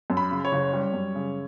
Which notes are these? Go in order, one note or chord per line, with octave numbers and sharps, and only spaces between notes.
F#2
B5
C#3
C#5
F#1
G3
F#2
C#3